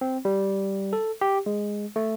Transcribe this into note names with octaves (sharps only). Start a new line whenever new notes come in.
C4
G3
A4
G4
G#3
A3